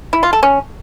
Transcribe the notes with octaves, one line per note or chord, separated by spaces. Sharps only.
E4
F4
A4
C#4